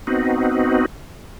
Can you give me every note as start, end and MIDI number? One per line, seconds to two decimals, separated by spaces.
0.07 0.86 59
0.07 0.86 60
0.07 0.86 63
0.07 0.86 66